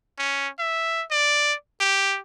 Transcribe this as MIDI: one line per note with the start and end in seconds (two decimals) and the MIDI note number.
0.18 0.48 61
0.59 1.03 76
1.11 1.54 74
1.80 2.18 67